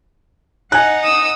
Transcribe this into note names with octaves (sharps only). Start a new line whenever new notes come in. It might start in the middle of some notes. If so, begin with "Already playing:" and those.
D#4 F#5 G#5 F#6
D#6 E6